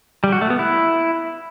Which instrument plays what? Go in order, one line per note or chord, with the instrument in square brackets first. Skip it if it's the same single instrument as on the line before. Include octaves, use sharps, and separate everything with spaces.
[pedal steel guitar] G3
F#4
A3
B3
E4